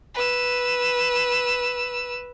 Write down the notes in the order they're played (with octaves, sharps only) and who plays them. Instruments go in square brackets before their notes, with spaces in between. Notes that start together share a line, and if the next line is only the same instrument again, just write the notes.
[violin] B4 E6